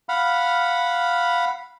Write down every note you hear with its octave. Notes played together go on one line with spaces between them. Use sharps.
F5 F#5 B5 F6